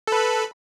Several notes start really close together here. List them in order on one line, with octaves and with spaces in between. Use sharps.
A4 B4 B5